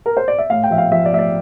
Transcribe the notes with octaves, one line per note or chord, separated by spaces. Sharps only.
A#4
C5
D5
E5
A2 F5
G5
F3 E5
F5
F3 E5
D5
A2 E5
D5